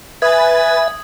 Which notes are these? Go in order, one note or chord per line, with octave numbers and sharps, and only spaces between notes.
B4 E5 G#5 D#6 G#6 A6